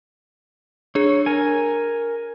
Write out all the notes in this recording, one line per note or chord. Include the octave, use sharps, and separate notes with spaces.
D4 G#4 C#5
A#4 G#5